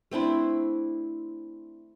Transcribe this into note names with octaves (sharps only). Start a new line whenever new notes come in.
A3 C4 D4 E4